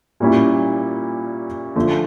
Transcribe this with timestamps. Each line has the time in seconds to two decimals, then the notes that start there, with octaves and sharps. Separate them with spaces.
0.20 A#2 G3 C#4 E4
1.76 D3 F3 A3